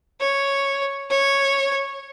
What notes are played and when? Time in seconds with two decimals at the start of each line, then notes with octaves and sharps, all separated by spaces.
0.21 C#5
1.10 C#5